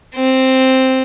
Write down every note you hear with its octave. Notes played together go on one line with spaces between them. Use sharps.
C4